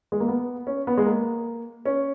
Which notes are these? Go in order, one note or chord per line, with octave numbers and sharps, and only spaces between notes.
G#3
A#3
B3
C#4
B3
G#3
A#3
C#4